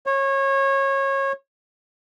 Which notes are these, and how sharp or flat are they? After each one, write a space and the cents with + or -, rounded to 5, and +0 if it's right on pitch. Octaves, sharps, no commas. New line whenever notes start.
C#5 -25